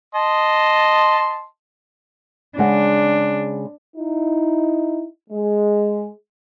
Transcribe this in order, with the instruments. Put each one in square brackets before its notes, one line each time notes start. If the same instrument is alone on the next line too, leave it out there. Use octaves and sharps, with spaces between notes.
[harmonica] D#5 A5 C6
[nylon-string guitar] C#3 G#3 F#5 [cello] D4
[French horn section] D#4 E4
G#3